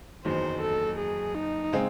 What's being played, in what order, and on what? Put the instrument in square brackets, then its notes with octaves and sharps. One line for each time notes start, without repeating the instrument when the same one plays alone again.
[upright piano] F#1 E2 D#3 F#3 [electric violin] C5
[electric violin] A4
G#4
D#4
[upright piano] C#3 G#3 C4 D#4